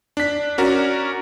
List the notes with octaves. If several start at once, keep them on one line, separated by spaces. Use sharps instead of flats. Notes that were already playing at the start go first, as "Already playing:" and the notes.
D4 B6
C#4 F#4 A#4 D5